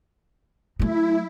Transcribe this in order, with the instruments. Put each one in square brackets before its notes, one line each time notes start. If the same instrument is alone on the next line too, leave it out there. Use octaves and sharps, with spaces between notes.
[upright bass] F#3 A3 [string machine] E4